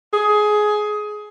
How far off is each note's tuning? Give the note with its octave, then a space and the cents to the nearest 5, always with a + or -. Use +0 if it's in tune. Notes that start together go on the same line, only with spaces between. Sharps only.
G#4 +15